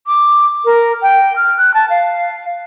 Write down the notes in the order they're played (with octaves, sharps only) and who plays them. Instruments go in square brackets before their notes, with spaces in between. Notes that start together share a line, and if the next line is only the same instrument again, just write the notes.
[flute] D6
A#4
G5
F6
F#6
A5
F5